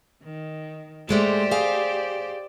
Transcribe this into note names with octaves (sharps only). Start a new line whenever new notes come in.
D#3
G#2 G#3 A3 G4 C5 D5
G#4 F5